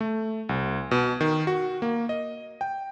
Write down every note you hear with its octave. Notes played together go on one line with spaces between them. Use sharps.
A3
C2
B2
D#3
F#4
A#3
D#5
G5